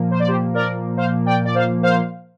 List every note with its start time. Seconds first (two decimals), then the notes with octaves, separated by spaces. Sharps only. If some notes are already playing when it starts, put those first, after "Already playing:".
Already playing: A#2 F3 A#3
0.11 C5
0.20 D5
0.28 G4 C5
0.54 A#4 D5
0.97 C5 F5
1.26 D5 G5
1.45 D5
1.55 C5 F5
1.83 C5 F5